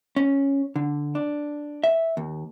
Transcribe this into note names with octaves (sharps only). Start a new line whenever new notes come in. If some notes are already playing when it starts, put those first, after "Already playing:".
C#4
D3
D4
E5
D#2